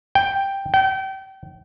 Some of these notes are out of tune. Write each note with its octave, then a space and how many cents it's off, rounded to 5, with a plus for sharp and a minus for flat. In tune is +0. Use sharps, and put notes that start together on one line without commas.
G5 +5
G5 -30